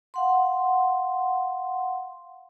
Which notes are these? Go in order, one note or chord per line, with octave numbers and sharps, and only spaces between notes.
F5 F#5 C6